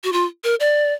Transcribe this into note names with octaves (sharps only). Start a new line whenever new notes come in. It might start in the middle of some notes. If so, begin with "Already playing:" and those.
F#4
F4
A#4
D5